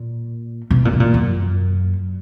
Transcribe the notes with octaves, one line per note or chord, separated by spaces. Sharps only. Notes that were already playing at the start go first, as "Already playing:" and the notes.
Already playing: A#2
B2
A#2
B2
A#2
F#2